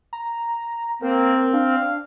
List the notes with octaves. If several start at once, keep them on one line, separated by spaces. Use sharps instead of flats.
A#5
A#3 C4 A#4
D4 F5